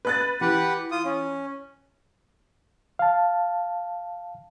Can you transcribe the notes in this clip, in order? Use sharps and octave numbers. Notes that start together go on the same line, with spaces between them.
B4 F#6 A6
E3 G4 B4 F#5
F4 D#6
C#4
F5 A5